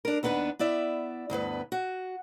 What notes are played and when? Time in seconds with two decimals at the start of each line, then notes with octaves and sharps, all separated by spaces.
0.05 D4 A#4
0.23 D#2 B3 D4 B4 F#5
0.59 B3 E4 D5 E5
1.30 D2 G2 B3 B4
1.72 F#4